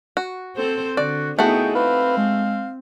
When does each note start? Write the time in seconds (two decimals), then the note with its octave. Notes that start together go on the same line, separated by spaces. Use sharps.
0.17 F#4
0.56 C4 A4 C5
0.97 D3 F#4 D5
1.39 A3 B3 D#4 E4 F#4 G#4 G5
1.75 C4 B4 F5
2.17 G#3